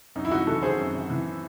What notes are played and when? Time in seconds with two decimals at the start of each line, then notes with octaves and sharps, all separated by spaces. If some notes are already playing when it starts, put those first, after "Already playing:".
0.15 F#2 D#4
0.25 E4
0.31 G#1 D#4 F#4
0.47 E3 F#4 A4
0.62 G#1 G#4 C5
0.78 F#2
0.94 G#1
1.10 E3